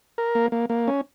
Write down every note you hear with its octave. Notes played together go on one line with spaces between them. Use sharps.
A#4
A#3
A#3
A#3
C#4